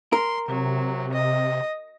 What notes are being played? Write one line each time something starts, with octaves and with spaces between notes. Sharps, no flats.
A#4 C6
C3 F#3
D#5